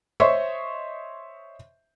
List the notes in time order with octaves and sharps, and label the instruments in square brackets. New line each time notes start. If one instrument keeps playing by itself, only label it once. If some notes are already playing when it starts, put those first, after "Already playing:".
[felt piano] C5 C#5 D#5 E5 C6 C#6